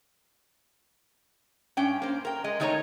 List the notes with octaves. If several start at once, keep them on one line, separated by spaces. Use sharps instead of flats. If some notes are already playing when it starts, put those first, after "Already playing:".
G2 C#4 G5
A#3 C5
A#4 G5
G#3 D#5
D#3 A3 D#4 A#4 C#5 A#5